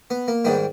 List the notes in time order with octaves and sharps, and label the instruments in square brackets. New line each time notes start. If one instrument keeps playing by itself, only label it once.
[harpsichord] B3
A#3
G#2 D#3 G3 B3